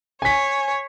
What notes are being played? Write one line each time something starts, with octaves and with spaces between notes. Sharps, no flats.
C#5 G#5 B6